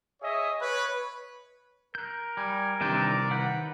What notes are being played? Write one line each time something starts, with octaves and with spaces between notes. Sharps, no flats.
G#4 C#5 D#5 E5 G#5
B4 C#5
A#4 F#6 G6
G3 G#5
C2 C3 D#3 E3 D4 D5 G5
D#3 B4 F#5 G6